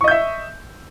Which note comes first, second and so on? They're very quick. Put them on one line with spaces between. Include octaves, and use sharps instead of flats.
C#6 D#5 G6 E5